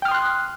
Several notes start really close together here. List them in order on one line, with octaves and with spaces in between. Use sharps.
G5 F6 D#6 C6 F#6